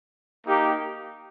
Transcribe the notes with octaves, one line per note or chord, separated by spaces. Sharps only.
A#3 D#4 G4